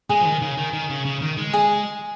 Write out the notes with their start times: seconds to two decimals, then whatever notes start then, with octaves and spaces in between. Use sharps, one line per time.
0.09 G#3 G#4
0.20 F3
0.25 D#3
0.42 C#3
0.57 D#3
0.73 D#3
0.90 C#3
1.05 C#3
1.22 D#3
1.37 G#3
1.53 G#4